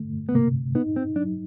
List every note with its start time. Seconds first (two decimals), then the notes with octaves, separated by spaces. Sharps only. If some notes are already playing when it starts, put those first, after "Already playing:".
Already playing: D3 A3
0.29 B3
0.35 C3 A#3
0.75 B3 D#4
0.96 C4
1.16 F#3 D4